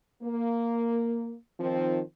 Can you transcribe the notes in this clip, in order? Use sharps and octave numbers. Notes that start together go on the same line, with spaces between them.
A#3
D#3 F3 C4